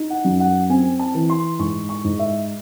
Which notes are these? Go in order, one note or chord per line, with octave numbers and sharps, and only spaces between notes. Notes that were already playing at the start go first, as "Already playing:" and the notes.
Already playing: D#4
F#5
F#2
F#5
C4 G#5
A5
E3
C6
G#2 C#6
C#6
G#2
E5